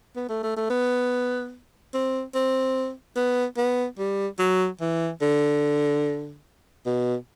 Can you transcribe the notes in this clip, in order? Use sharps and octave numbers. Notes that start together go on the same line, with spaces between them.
B3
A3
A3
A3
B3
C4
C4
B3
B3
G3
F#3
E3
D3
B2